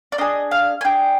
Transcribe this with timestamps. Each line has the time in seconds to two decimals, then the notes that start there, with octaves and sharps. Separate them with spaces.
0.12 D5
0.18 D4 G#4 D#5
0.51 F5
0.81 G#5
0.84 D4 G#4 G5